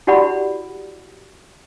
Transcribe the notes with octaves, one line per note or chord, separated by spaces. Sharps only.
E4 F#4 G4 D5 F#5 B5